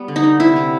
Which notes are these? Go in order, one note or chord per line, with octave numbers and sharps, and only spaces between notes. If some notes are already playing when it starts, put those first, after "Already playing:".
Already playing: G3 B3
D3
D#4
D3
C3 E4
C3